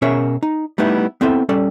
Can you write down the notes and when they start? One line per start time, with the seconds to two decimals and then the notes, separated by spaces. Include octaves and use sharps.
0.02 B2 C#4 G#4 A#4 C#5 E5
0.43 D#4
0.78 G3 A3 B3 D#4 E4
1.21 B3 C4 E4 A4 E5 G5
1.49 G3 C#4 A4 D5